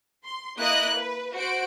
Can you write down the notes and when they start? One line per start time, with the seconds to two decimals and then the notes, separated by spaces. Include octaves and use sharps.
0.24 C6
0.59 A#3 E4 D#5 F#6
0.97 B4
1.34 F#4 C5 D7